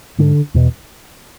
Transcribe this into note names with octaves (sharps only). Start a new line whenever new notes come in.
G#2 D3
E2 B2